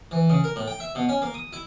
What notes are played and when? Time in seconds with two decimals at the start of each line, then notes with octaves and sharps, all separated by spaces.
0.11 E3
0.30 C#3
0.44 A#4
0.56 A2
0.67 G5
0.80 E5
0.95 B2
1.09 C#4
1.22 A#3
1.34 D#6
1.53 E4